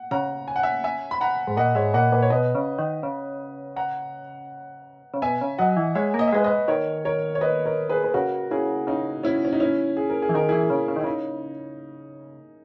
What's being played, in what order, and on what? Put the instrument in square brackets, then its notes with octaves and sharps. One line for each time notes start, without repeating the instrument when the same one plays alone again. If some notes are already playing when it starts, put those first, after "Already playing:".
Already playing: [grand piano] F#5
[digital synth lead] C#3 [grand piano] F#5 A#5
[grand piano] G#5
F#5
E5 G#5
E5 G#5
B5
F#5 A#5
[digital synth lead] G#2
[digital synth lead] A#2 [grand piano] D#5 F#5
[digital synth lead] G#2 [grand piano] C#5 E5
[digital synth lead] A#2 [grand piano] D#5 F#5
[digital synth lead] A#2 [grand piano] B4 D#5
[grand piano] C#5
[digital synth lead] B2 [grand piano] B4 D#5
[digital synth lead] C#3
D#3
C#3
[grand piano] F#5 A#5
[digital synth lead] C#3
[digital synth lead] B2 [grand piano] E5 G#5
[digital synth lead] C#3
[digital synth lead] F#3 [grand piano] D#5 F#5
[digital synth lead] E3
[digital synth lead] G#3 [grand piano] C#5 E5
[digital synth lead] A#3
[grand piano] D#5
E5
[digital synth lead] G#3 [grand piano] B4 D#5
[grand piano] B4 D#5
[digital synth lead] D#3 [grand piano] A#4 C#5
[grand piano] A#4 C#5
C#5
B4 D#5
A#4 C#5
G#4 B4
B4
[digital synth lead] C#3 [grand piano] F#4 A#4
[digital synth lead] C#3 [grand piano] E4 G#4
[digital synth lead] C#3 [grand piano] D#4
[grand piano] C#4 E4
C#4
D#4
C#4 E4
G#4
A#4
G#4
[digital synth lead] E3
[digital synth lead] D#3 [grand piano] A#4
[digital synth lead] E3 [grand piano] E4 G#4
[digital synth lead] C#3
C#3
D#3
[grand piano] E4
[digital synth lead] C#3 [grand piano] D#4